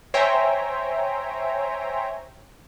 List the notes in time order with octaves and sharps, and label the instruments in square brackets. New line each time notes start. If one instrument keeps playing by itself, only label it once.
[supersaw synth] C5 C#5 E5 G5 G#5 A#5